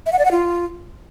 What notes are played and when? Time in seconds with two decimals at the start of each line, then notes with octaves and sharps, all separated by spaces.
0.06 E5
0.12 F#5
0.19 D5
0.25 F#5
0.31 F4